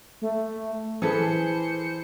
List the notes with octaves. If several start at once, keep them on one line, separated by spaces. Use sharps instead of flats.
A3
E3 G#4 A4 B4 C5 C#7